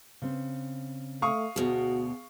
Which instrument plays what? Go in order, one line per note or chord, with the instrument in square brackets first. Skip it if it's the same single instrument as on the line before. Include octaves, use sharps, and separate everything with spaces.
[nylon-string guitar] C#3 C4
[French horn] A3 [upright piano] F5 C#6 D#6
[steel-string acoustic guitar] D2 B2 [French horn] F#4 [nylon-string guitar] G#4